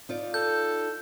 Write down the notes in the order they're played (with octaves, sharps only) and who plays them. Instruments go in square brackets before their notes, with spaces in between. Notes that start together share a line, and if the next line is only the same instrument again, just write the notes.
[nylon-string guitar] D#4 F4 D5
[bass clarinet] A4 [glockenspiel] G6